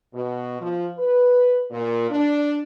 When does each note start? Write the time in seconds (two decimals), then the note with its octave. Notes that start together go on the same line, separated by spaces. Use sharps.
0.14 B2
0.61 F3
0.99 B4
1.71 A#2
2.10 D4